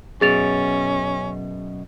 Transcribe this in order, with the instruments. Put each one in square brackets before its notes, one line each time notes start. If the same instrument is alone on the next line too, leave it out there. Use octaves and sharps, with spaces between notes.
[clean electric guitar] F#2 B2 [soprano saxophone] C#4 [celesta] G#4 A6 F7